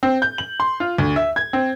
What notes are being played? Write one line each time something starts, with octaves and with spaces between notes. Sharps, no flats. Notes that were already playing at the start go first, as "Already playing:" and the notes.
C4
G6
F#7
C6
F4
D2
E5
G#6
C4